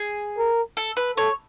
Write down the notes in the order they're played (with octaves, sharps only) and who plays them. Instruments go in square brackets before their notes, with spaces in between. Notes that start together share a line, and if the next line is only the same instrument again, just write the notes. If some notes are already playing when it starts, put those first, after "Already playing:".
Already playing: [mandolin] G#4
[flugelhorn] A#4
[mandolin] A4
B4
[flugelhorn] A4 [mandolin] C#5